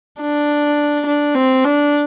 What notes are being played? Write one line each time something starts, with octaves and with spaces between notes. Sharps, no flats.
D4
D4
C4
D4